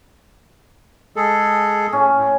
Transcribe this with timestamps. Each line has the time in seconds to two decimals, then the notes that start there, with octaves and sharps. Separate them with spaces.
1.16 G#3 G#4 A4
1.93 A2 C#4
2.17 A2